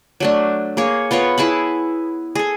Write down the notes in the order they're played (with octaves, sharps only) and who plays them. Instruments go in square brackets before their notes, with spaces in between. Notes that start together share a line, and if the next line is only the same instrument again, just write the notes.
[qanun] F#3 A3 D4
A#3 G#4 C#5
B3 F4 A#4 C#5
E4 G#4 A5 B5
G#4 A4